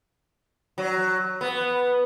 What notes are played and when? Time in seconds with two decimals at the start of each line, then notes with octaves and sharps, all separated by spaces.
0.78 F#3
1.41 B3